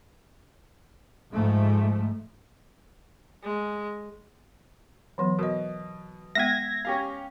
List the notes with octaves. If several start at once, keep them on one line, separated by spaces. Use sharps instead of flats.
G#2 F3 A3
G#3
E3 F#3 B3
B2 A#4 D#5
G#3 B3 E5 G5 G#6 A#6
C#4 G4 F5